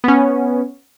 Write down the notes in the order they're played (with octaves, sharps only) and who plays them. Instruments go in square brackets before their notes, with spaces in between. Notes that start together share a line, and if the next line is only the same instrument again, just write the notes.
[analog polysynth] B3 C#4